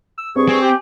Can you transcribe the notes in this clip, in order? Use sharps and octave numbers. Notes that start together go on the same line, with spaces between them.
E6
G2 C4 G#4 C#6
C4 G#5
G4